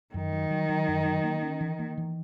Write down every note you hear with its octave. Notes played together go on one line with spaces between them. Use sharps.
F#2 D#3
F#3
F#3
F#3
F#2
F#3
A#3
C#4
E3
A#3
E3